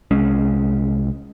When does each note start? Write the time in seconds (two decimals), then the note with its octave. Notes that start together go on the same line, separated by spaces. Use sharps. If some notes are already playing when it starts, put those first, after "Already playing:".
0.11 C2 G#3 C#4